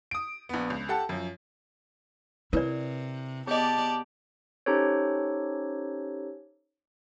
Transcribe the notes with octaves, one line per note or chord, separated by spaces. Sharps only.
D#6 D7
A#1 B3
C#2
G4 A4 F#5 A5
F#2 F3
C3 E4 A#4 B4 D5
B3 G4 G#4 D5 D#5 A5
C#4 D#4 G4 A4 C5 C#5